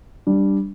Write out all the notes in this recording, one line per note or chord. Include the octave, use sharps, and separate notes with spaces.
G3 D4